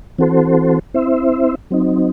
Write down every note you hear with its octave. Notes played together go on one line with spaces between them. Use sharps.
E3 C4 F#4 A4 C5
C4 E4 C5 E5
F#3 C4 D#4